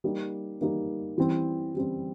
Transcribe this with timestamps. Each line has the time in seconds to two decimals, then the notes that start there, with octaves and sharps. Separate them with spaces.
0.04 G3 A#3 D#4
0.61 G3 A#3 D#4
1.18 E3 G3 C4
1.74 E3 G3 C4